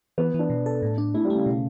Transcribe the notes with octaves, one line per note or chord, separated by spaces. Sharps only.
E3 B3
E3 D4
B2
A4
A2
D4
A3 E4
G3
A3
C#3
B2